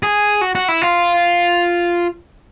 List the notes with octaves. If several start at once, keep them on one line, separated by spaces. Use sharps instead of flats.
G#4
F#4
F#4
E4
F4